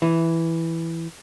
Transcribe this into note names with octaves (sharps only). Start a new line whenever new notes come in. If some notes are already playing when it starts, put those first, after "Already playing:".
E3